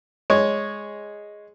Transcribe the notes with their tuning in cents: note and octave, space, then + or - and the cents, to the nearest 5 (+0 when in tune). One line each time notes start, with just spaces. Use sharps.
G#3 +0 C#5 +0